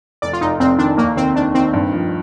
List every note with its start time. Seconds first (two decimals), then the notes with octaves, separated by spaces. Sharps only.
0.22 F1 D5
0.33 F4
0.41 F1 D#4
0.60 F1 C4
0.79 D#3 D4
0.97 D#2 A#3
1.16 D#3 C4
1.35 D#3 D4
1.54 D#3 C4
1.74 G2
1.93 F3